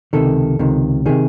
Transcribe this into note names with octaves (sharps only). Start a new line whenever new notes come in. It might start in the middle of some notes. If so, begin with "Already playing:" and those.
C#2 C3 D#3 A4
C#2 C3 D#3
C3 D#3 G#4